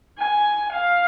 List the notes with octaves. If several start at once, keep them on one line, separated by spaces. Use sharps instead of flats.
G#5
F5